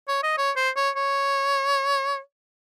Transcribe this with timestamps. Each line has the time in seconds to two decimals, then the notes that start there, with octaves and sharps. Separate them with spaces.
0.08 C#5
0.23 D#5
0.38 C#5
0.56 C5
0.77 C#5
0.96 C#5